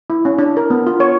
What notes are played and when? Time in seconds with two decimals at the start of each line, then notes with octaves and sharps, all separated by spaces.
0.10 E4
0.25 C#4
0.38 D4
0.57 A#4
0.70 B3
0.87 F4
1.00 C#5